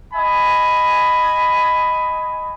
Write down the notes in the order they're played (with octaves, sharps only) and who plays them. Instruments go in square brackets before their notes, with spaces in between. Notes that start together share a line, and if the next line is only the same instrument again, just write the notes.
[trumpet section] D#5 G#5 B5